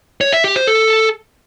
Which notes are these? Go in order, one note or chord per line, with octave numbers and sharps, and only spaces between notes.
C#5
E5
G4
C5
A4